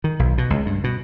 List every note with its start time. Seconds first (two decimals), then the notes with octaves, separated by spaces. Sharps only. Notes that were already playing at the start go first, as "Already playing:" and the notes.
0.04 D#3
0.19 B1
0.38 B2
0.50 C#2
0.66 G2
0.84 B2